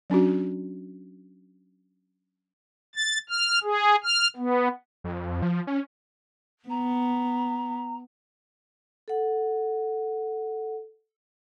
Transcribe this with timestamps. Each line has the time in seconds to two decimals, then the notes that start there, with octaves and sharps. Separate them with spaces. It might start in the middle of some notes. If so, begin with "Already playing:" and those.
0.10 F#3 C#4 D4 F#4
2.95 A6
3.30 F6
3.63 G#4
4.04 F6
4.37 B3
5.04 F2
5.42 F3
5.67 C#4
6.69 B3 A#5
9.08 A4 F#5